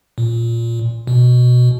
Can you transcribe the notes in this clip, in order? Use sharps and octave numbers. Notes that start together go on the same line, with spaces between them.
A#2
B2